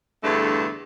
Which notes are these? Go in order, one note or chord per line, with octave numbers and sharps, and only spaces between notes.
E2 G2 D3 A3